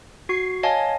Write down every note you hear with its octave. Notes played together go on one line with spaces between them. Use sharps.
F#4 C#6 C7
C#5 D#5 F5 G#5 A5